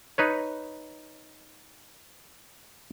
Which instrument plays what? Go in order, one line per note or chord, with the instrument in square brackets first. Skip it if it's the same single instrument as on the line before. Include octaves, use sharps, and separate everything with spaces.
[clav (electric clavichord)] D#4 B4 C#5